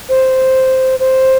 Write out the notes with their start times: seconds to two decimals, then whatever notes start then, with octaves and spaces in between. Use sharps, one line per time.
0.09 C5
1.00 C5